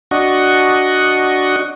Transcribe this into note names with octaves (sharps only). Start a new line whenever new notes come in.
D4 F#4 D#5 F#5 C#6